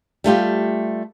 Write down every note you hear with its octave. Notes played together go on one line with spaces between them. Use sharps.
G3 A3 F4 G4